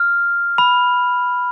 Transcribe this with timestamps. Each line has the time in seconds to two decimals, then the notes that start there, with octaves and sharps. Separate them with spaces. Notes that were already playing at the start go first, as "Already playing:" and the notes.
Already playing: F6
0.58 B5